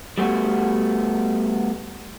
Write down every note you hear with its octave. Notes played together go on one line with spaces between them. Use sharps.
G3 A3 B3 F#4